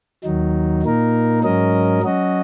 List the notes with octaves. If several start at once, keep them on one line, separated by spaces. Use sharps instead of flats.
D#2 D#3 F#3 D#4
A#2 A#3 D#4 A#4
G#2 F#3 C#4 A#4 D#5
F#3 C#4 F#4 D#5